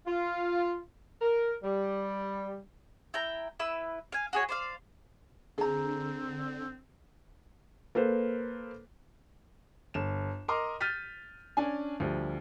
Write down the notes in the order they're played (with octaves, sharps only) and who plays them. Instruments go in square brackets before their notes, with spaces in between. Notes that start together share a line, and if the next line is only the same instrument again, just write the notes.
[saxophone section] F4
A#4
G3
[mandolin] E4 G5 A#5
E4 B4 E6
F5 G#5
F#4 G#4 C#5
C5 D5 F5
[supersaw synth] D3 [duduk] C4 [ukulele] G#4 A#5
[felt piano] A#3 A4 B4 C5
G1 E7
A#4 D#5 A#5 C6 D6
F6 G6 A6 B6 D#7
C#4 D4 G#5
D2 F3 G3